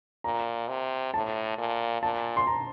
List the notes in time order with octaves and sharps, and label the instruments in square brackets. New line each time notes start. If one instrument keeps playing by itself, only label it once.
[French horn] A#2 [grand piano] A#5
[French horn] C3
[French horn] A2 [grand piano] A5
[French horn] A#2
[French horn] A#2 [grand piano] A5
[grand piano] C6
A#5